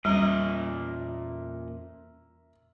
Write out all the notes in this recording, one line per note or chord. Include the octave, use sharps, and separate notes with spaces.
E2 A#2 G3 C#4 D#5 E5 A#5 F6